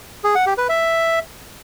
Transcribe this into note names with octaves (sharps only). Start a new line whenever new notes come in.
G#4
F#5
G4
B4
E5